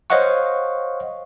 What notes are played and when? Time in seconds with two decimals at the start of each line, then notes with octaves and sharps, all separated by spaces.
0.10 C5 C#5 D#5 F5 F#5 C#6